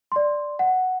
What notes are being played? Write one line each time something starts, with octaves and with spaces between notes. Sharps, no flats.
D5 C6
F#5